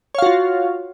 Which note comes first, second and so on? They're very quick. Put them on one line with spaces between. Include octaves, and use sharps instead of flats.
C#5 F5 F#4 F4